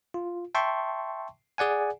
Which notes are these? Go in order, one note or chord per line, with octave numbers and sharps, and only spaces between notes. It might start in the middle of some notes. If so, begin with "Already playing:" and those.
F4
E5 G5 A5 C6 C#6
G#4 D5 F#5 G#5